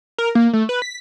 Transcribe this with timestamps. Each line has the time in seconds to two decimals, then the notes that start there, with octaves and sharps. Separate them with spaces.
0.18 A#4
0.35 A#3
0.53 A3
0.69 B4
0.82 B6